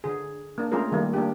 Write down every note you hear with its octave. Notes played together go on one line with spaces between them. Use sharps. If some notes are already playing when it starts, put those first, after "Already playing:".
D3 G#4
A#3 D4
G#3 A3 C#4 F4 G#4 A#4
D#3 G3 A3 A#3 D#4
A#3 D4 G4